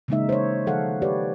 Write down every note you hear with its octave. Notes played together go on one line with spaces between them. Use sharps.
C#3 E3 G#3 A#3 D#4 E5
C5 C#5
D#3 F3 A4 F5 F#5
G4 B4 C#5 D5